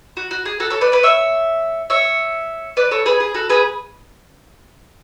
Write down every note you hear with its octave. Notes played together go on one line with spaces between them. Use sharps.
F#4
F#4
G#4
F#4 A4
A4 C#5
B4 D5
B4 D5
C#5 E5
C#5 E5
B4 D5
A4 C#5
G#4 B4
G#4
F#4 A4
G#4 B4